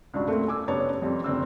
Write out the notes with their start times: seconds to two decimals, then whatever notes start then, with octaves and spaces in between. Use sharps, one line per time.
0.14 C#2 G2 D4 F#4
0.28 A3 A#3 C4
0.48 G#5 D6 E6
0.68 F#1 B3 D4 G4 C#5 A5
1.02 F2 G3 C4
1.24 F#1 D3 C4 E6